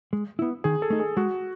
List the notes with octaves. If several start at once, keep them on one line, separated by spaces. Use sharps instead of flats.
G#3
B3 E4
D#3 G#4
A4
A3 D#4
G#4
G#3 F#4